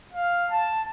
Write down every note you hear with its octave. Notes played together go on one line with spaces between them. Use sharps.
F5
A5